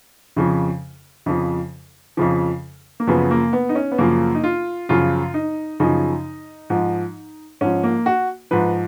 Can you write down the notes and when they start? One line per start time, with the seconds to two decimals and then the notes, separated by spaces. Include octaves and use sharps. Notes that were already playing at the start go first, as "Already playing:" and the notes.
0.36 F2 C#3 F3
1.26 F2 C#3 F3
2.17 F2 C#3 F3
3.00 A#3
3.07 F#2 C#3 F3 B3
3.31 A#3
3.53 B3
3.69 D#4
3.75 C#4
3.92 B3
3.98 F#2 C#3 F3 A#3
4.35 D#4
4.44 F4
4.89 F#2 C#3 F3 F4
5.34 D#4
5.80 F#2 C#3 F3 D#4
6.70 G#2 F3
7.61 G#2 F3 C#4
7.84 A#3
8.06 F#4
8.51 G#2 F3 B4